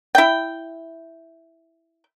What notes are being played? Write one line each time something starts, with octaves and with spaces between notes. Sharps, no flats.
E4 G5